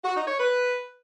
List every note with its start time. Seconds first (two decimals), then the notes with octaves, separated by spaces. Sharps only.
0.04 F#4
0.16 D#4
0.27 C#5
0.38 B4